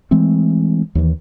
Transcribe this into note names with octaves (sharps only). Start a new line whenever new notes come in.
E3 G#3 A3 C4
D#2 E3